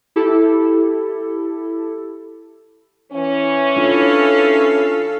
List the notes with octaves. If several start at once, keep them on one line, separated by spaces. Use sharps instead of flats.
E4 G4 A4
E3 C#4
D4 E4 F4 A4 F5